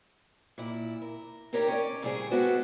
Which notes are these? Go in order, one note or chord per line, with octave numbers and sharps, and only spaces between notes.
A#2 E4
A#4
C4 D#4 G4 A#4 C#5 D5
C#4 D5
A#2 C#3 G3 A3 C4 G#4
G#3 B3 F#4 G4 A4 C5